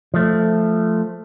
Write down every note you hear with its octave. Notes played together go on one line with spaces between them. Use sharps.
F3 A3